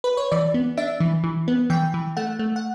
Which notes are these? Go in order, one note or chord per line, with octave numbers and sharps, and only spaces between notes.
B4
C#5
E3 D5
B3
D4 E5
E3
E3
B3
E3 G5
E3
A3 F#5
A3
F#5